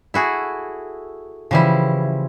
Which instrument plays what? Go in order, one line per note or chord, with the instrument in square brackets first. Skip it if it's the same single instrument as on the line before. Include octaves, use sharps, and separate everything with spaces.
[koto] E4 F#4 G#4 [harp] A4
[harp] C#3 E3 C5 [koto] F3 G3 E4